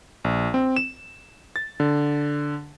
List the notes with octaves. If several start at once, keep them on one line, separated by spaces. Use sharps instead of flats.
A#1
C4
E7
A6
D3